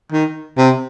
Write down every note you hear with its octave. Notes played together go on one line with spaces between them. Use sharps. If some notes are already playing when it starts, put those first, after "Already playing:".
D#3
C3